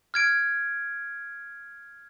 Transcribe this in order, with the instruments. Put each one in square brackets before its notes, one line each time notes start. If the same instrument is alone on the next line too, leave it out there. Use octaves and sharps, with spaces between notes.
[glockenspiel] F6 G#6 D7